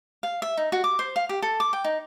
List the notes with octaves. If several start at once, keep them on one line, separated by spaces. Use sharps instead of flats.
F5
E5
D#4
F#4
D6
C5
F5
G4
A4
D6
G5
D#4